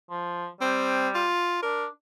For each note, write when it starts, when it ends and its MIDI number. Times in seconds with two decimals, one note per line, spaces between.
0.10 0.48 53
0.61 1.26 55
0.61 1.09 60
1.15 1.61 65
1.63 1.88 62
1.63 1.86 70